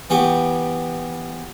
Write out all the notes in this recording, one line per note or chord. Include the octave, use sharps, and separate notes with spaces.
E3 B3 G4 G5 C#6 D#6